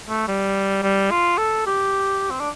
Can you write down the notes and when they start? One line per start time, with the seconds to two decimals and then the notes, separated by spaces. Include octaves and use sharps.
0.09 A3
0.28 G3
0.83 G3
1.11 F4
1.38 A4
1.67 G4
2.31 C4
2.40 D4